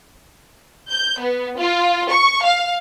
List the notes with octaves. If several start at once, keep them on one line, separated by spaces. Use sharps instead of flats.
G6
B3
F4
C#6
F5